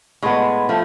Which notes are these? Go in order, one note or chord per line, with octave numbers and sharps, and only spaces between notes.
A2 G#3 B3
F3 A3